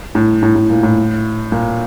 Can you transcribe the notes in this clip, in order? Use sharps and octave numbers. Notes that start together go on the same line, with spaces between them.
A2
A2
A2
A#2
A2
A#2